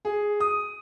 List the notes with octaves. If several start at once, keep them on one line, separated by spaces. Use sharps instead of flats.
G#4
D#6